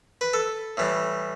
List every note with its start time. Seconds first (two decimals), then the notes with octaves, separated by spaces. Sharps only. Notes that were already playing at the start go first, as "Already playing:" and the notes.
0.21 B4
0.33 A4
0.77 A2 E3 G3